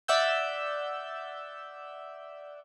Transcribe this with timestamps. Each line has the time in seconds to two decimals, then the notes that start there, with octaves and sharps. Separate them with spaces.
0.08 D5 E5 F#5 E6 G6